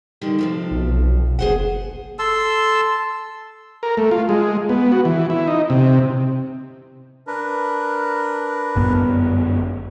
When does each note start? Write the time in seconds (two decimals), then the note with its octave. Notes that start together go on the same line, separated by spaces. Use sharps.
0.21 D3 D#3 G3
0.39 C3 F3 A3
0.70 B1
1.39 F#1 G#4 C5 F#5
2.19 A4 A5 C6 E6
3.83 A#4
3.97 A3
4.11 F4
4.29 G#3
4.69 B3
4.92 F#4
5.05 E3
5.30 E4
5.47 D#4
5.70 C3
7.27 D4 A#4 B4
8.76 G1 F#2 B3